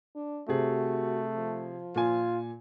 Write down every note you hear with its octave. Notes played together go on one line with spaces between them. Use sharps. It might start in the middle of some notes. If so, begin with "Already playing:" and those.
D4
C3 A3 F#4 G#4
F3
A#2 F4 G#5